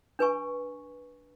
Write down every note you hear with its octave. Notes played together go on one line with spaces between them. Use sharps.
D4 B4 G#5 C#6